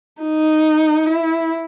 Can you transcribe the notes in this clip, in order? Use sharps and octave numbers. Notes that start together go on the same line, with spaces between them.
D#4
E4